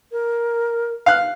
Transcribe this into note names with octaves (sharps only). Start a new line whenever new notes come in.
A#4
F5 F#6